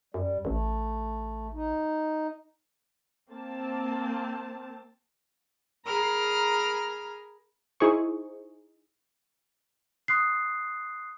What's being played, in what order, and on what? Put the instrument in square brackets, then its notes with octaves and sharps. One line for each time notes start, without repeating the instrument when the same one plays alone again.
[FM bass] F#2 [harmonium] G3
[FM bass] A1 [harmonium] A3
[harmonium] D#4
[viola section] A#3 C4 A5
[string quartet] G#4 A#4 A#5 B5 F6
[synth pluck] D#4 E4 G#4 C5 C#6
[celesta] C6 D#6 F#6 C7